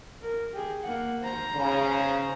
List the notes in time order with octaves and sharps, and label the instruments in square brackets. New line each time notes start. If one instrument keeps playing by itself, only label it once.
[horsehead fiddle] A#4
G4 G#4
A#3 F#5
C5 A#5
[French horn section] C#3